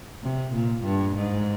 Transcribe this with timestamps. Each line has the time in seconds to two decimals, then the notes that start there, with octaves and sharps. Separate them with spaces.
0.23 C3
0.54 A#2
0.85 G2
1.16 G#2